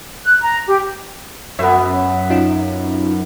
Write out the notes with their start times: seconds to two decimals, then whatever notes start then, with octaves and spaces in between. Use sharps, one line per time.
0.24 F#6
0.42 A#5
0.68 G4
1.59 F#2 B3 E5
2.30 C#4 D#4 F4